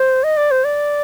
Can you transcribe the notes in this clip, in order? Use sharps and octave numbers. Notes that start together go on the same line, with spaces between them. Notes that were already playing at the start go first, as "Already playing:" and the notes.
Already playing: C5
D#5
D5
C5
D5